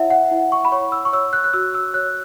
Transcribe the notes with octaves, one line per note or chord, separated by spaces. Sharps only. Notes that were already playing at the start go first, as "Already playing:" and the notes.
Already playing: E4 C#5 E5 F#5
F#5
E4
C#6
B5
C#5 C#6
E6
C#6
C#5 E6
F#6
F#6
F#4 E6
E6
C#5 F#6